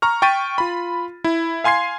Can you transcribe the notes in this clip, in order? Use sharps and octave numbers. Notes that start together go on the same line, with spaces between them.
A#5 C#6 F6
G5 C#6 A6 B6 D#7
F4 B5
E4
F5 G#5 C6 G#6 C7